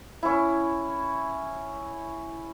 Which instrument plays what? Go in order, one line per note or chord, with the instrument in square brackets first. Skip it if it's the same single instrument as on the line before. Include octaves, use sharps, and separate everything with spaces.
[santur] C#4 E4